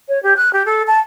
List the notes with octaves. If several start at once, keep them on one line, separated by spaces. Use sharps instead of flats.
C#5
G4
F#6
G4
A4
A5